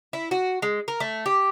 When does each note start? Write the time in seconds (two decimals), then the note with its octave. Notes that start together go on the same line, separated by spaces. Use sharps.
0.13 E4
0.31 F#4
0.62 G#3
0.88 A#4
1.00 A3
1.26 G4